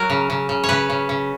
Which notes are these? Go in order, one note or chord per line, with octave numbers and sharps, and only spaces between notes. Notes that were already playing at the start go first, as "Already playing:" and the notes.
Already playing: F#3 A#4
C#3
C#3
C#3
C#5
C#3 B4
C#3
C#3